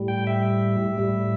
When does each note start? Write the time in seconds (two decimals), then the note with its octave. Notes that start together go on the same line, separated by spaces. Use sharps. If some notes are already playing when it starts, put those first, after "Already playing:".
Already playing: A2 G3
0.08 G5
0.27 E5
0.98 A2 G3